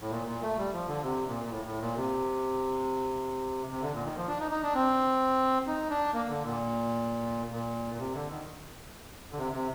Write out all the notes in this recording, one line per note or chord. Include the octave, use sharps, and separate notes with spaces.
A2
A#2
A#2
A3
G3
F3
D3
C3
A#2
A#2
A2
A2
A#2
C3
C3
D3
A#2
D#3
F3
D4
D#4
D#4
D4
C4
D#4
D4
A#3
D3
A#2
A#2
A#2
C3
D3
D#3
D3
C3
C3